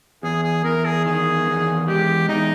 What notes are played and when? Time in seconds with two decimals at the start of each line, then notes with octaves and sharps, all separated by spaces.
0.23 E2 G#4
0.43 G#4
0.64 E2 A#4
0.85 G#4
1.05 D#3 G#4
1.47 E2
1.88 G#3 G4
2.29 E2 D#4